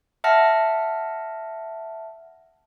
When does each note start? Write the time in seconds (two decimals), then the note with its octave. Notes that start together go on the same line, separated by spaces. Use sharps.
0.24 E5 F#5 A5 F6 A#6